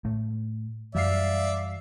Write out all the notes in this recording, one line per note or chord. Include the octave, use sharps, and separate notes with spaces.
A2 A3
F#2 E3 G3 D5 E5 F5 C7